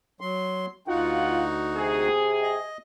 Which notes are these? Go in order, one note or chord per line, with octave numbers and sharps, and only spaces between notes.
F#3 C6
D2 D#4 F4 F#4 F#5
C3 G#4
D#5